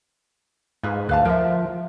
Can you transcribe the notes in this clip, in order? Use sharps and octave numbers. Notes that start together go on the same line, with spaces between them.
G#2 F4 G#4 B4
D2 B4 F5 A5
F3 A#4 E5